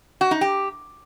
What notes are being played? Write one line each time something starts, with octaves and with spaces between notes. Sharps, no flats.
F#4
D#4
G4